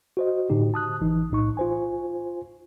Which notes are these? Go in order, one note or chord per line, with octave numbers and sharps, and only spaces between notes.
F#4 C5 D#5
A2 D3 D#4 G4
A5 D#6 F#6
G#1 E3 D#4
B1 A2 D#4 C#6
F4 C5 G#5